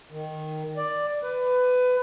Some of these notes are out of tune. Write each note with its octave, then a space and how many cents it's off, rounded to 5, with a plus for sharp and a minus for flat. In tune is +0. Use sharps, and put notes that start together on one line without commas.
D#3 -5
D5 +5
B4 +20